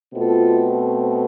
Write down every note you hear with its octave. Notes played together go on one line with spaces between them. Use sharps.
B2 A3 C4 F4 A4